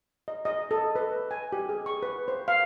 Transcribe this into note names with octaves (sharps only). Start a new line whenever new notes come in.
D#5
D#5
A4
B4
G#5
G4
G#4
C#6
B4
C5
F5